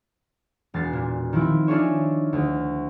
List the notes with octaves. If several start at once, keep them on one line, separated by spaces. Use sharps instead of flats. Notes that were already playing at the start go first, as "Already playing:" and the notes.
E1 A6 C7
A#2
D#3 F3 C4 E4
D4 D#4 F4 G#4 C#5 E5
D2